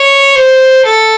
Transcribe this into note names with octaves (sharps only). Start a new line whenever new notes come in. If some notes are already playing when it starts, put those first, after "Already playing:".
Already playing: C#5
C5
A4